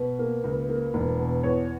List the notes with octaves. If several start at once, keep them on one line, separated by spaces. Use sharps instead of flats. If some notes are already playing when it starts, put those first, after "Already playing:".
Already playing: B2 B4
A#3
C#2
A#3
E1
B2
E2 C#5